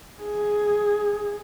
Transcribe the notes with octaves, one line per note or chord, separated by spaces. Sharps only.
G#4